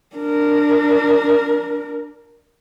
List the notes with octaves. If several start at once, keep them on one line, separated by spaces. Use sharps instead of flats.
D4 A#4